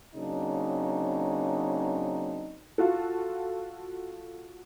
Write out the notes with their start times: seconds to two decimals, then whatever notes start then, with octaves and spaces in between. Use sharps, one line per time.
0.16 C#3 F#3 A#3 C4 D4 D#4
2.78 F4 F#4 A4